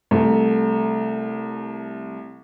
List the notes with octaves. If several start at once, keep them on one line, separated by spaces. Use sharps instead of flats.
C2 A3